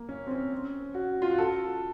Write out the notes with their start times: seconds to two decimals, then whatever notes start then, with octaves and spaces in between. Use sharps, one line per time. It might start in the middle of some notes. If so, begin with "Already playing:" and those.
Already playing: A#3
0.09 C#4
0.27 C4
0.31 C#4
0.52 C#4
0.94 F#4
1.22 F4
1.30 F#4
1.38 A4